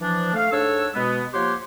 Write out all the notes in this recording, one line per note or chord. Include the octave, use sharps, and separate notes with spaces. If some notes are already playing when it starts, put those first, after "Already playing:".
E3 F3 D4
A3 F5
G#2 D4 A4 C#5 E6
B2 G#3 B3
F3 A#3 G4 C#5 F#5 C6